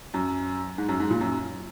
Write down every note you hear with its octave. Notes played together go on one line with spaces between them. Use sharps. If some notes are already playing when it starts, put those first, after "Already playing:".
F#2
G#2
F#2
G#2
A#2
F#2